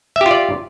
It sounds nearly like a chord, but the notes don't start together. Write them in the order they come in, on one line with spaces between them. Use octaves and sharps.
E5 G4 F4 D5